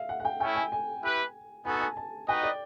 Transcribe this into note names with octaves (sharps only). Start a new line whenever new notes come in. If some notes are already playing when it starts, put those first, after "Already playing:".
Already playing: E5 F5
F#5
F#5
G5
A3 C#4 E4 G5
G#5
G#5
E4 G4 B4
B3 D#4 F#4 A4 G#5
A5
G#5
A5
D#4 F#4 B4 D#5 G5
D5